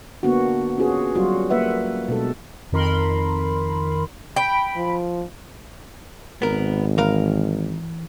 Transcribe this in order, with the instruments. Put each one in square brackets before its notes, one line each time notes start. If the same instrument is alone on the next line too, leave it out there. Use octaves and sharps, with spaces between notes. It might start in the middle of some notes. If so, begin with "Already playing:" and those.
[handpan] D3 A#3 B3 D4 F#4
C#4 F4 F#4 G#4 B4
F#3 G3 F4 F#4
A#3 F4 B4 E5 F#5
B2 G#3 D4 A4
[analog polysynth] F2 D#3 A#4 B5 C6
[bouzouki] G5 [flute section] B5
[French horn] F3
[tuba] G#1 [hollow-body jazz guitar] B3 A#4
[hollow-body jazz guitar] E3 A#4 F5